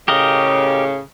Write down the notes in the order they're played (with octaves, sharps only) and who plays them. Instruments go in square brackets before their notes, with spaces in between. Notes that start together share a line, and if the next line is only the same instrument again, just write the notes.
[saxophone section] A2 C#3 [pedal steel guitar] G4 A#4 D#5